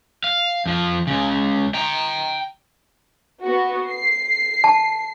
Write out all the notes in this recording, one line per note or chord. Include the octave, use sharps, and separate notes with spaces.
F5
F2 F3
C#2 C#3
G5 A#5
B3 F#4
C7
A5